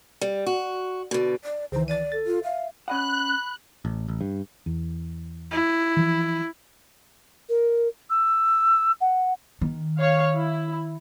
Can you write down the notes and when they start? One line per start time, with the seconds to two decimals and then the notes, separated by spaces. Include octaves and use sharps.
0.21 G3
0.46 F#4
1.11 B2 D3
1.43 D5
1.72 C#2 D#3 E3 C5
1.88 D5 A6 D#7
2.12 A4 A6
2.26 F4
2.44 E5 F5
2.88 C#4 D#5 F#5 B5 F#6
3.85 A1
4.08 A1
4.21 G2
4.66 E2
5.51 E4
5.97 E3 F3
7.49 A#4
8.10 E6
9.01 F#5
9.61 D#3
9.99 C#5 F5
10.36 E4